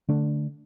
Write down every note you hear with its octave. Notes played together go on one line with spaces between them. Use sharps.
D3 A3 D4